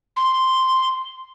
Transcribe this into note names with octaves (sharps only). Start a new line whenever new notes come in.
C6